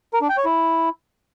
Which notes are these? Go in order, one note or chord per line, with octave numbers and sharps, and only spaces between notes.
A#4
D4
G5
C#5
E4